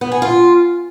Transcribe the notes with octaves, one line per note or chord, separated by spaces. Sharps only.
B3
G#4
F4